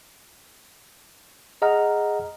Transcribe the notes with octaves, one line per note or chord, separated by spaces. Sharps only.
G#4 D#5 F#5 A#5 F6